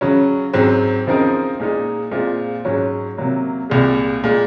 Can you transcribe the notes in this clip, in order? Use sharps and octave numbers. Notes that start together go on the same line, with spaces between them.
C#3 F#3 C#4
G#2 F#3 C4
C#3 F3 C4 D#4 A#4
A#2 G#3 D#4
A#2 G#3 C4 F4
G#2 F#3 C#4
C3 F#3 A#3
C2 A#2 G#3
A#2 G#3